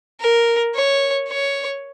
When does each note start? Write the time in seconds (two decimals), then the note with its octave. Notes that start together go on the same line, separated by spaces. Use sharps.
0.20 A#4
0.75 C#5
1.28 C#5